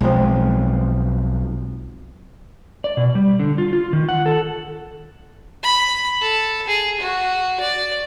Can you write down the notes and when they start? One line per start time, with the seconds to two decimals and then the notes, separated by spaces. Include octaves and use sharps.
0.01 B1 F3 G#3 C4
2.84 D5
2.97 B2
3.15 G3
3.39 D3
3.58 F4
3.73 F4
3.93 D#3
4.09 F#5
4.26 A4
5.63 B5
6.21 A4
6.67 G#4
7.00 F#4
7.60 D5